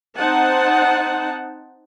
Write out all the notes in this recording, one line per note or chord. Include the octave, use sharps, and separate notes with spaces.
C4 D#4 C5 F#5 A5